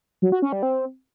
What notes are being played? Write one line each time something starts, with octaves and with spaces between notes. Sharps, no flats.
F#3
F#4
C#4
G3
C4